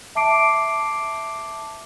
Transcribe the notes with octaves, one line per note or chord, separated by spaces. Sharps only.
E5 A5 D6 C7 D7